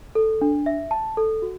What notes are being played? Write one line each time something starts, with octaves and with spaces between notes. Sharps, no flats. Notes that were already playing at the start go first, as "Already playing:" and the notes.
A4
D4
E5
A5
A4
F#4